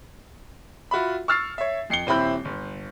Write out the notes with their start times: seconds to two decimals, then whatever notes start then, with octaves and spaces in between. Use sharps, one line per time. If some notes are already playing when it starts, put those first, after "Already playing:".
0.91 F4 F#4 E5 B5
1.28 C#6 E6 F6 A6 C7
1.58 C#5 E5
1.90 F2 C7 C#7 G7
2.07 D#1 C4 E4 B5 G6
2.45 G1